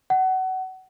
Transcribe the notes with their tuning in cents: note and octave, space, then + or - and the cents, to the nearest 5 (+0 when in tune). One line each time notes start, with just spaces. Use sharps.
F#5 +25